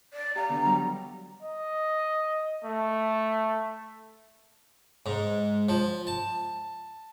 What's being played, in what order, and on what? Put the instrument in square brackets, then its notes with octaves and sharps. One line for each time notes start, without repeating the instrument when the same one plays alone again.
[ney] D5
[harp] G4 F5 [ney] A#5
[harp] D3 D#3 B3
F#3 G3
[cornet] D#5
A3
[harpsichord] G#2
F3
A5